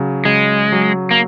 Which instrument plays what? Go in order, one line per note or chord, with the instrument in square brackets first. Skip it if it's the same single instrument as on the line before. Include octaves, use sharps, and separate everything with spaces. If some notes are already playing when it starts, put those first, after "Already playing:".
Already playing: [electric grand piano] C#3 F#3
[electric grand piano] C#3 [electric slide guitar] G#3
[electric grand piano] F#3
[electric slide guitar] A#3